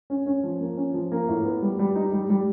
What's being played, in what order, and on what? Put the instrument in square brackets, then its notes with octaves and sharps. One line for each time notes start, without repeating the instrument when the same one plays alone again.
[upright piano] C#4
C#4
F3
A#3
C#4
F3
A#3
A2
B3
G3
G3
D#4
G3
G3